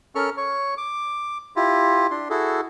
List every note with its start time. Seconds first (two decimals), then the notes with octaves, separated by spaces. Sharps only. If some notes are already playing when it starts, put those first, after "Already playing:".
0.15 C#4 A4 A#4 C#6 F6
0.37 C#5 C#6
0.77 D6
1.56 E4 F4 G4
2.11 D4 C6
2.30 E4 F#4 G#4 A4